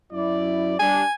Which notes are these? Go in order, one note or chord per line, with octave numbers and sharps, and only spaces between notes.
F#2 E4 D5
G3 D4 G#5